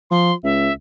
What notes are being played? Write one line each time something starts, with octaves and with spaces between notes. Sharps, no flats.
F3 C6
C#2 E5